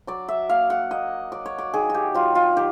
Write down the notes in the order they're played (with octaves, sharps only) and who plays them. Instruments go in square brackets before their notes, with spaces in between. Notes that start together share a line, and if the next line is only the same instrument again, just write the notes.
[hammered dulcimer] F#3 D5
E5
A#3 F5
F#5
A#3 D#5
F#3 D5
C#5
D5
D#3 G#4
F#4 G4
F#3 F4
F4
D#3 G4